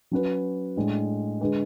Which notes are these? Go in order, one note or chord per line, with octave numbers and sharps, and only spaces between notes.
F#3 C#4 F#4 B4
A2 G#3 D4
D3 G#3 D4 G#4 B4